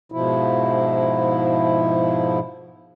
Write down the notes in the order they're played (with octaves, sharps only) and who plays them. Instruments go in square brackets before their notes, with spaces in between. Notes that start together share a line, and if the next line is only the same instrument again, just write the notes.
[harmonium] G#2 B2 F3 E4